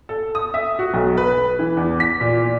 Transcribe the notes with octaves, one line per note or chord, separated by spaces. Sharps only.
A4
D#6
E5
F#4
B1
B4
E3
E2
B6
A#2